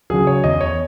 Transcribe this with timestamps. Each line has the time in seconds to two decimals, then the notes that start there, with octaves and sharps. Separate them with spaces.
0.10 C#3 F#3 G#4
0.27 C#5
0.44 E2 D#5
0.61 C#5